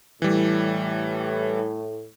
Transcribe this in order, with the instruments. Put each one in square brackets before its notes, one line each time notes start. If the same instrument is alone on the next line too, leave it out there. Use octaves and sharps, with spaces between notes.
[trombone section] A2 [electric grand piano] E3 G3